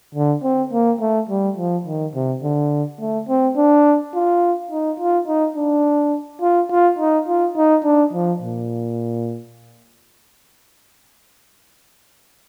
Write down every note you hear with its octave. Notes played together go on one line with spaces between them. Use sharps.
D3
C4
A#3
A3
G3
F3
D#3
C3
D3
A3
C4
D4
F4
D#4
F4
D#4
D4
F4
F4
D#4
F4
D#4
D4
F3
A#2